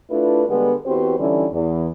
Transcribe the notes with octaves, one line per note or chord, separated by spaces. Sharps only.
A3 D4 E4 F4 B4
D3 G3 G#3 B3
E2 C4 F#4 G4 B4 C5
D3 E3 G3 C#4 D#4 E4
E2